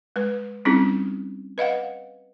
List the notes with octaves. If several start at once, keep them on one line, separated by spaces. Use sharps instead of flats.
G#3 B4
G3 C4 C#4 D#4 E4 G#4
B4 D#5 F5 F#5